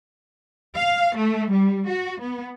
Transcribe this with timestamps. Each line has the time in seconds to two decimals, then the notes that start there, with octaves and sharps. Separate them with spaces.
0.75 F5
1.16 A3
1.51 G3
1.88 F#4
2.21 B3